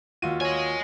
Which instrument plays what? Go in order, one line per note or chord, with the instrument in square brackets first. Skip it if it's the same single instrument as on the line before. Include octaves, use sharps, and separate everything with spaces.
[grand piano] D#2 F4 F#4 [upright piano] D#7
[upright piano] C#5 [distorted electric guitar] D#5 G#5